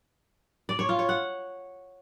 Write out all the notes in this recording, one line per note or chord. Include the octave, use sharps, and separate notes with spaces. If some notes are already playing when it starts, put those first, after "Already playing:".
D5
C#5
F4
C#5
F#5